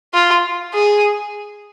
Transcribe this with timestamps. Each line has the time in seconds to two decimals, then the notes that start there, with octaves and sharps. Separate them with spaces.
0.14 F4
0.74 G#4